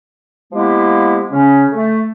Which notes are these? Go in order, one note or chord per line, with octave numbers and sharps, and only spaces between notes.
F3 G#3 A#3 B3 E4 G4
C#3 C#4
A3